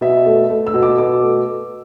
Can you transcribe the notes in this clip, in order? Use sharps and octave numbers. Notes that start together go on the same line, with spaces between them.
B2 E5
A3
A3
E6
B2
D6
B2 D6
A3